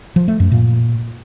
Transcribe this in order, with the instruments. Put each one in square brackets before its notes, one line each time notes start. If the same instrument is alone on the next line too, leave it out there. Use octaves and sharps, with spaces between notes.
[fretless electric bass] F3
A3
F#2
A#2